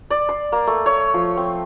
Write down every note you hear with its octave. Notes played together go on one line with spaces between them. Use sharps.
D5
C6
A#3
A3
C#5
F3
C4